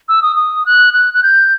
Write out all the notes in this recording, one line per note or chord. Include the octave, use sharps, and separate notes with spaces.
E6
D#6
D#6
F#6
F#6
F#6
G6